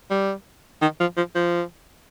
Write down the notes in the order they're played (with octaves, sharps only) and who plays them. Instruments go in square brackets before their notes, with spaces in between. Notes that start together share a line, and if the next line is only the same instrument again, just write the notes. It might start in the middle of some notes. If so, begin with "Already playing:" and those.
[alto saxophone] G3
D#3
F3
F3
F3